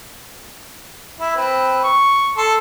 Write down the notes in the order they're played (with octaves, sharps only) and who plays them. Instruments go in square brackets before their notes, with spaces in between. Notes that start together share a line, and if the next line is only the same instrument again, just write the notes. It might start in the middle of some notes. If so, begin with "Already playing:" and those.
[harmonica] E4
C4 B4
C#6
A4 C6